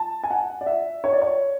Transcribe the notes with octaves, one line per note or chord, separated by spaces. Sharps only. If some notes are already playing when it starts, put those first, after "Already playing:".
Already playing: A5
G#5
F#5
D5
E5
C#5
D5
C#5